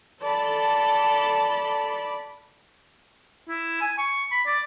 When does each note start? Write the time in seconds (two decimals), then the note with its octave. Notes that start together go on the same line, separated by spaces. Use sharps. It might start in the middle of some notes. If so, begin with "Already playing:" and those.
0.22 A4 D5 B5
3.49 E4
3.81 G#5
3.98 C#6
4.32 B5
4.46 D5